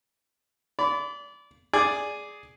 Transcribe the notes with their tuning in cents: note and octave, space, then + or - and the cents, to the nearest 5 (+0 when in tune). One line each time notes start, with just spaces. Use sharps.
D5 -30 B5 +25
G#4 +0 D5 +0 G#5 +0